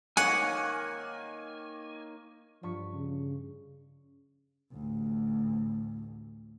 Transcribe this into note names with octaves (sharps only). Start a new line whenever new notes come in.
D#3 A#3 C#5 F#5 G#5
G2 F3 C#6 B6
C#3
A1 D2